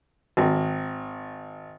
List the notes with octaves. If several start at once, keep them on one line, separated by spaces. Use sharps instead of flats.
G#1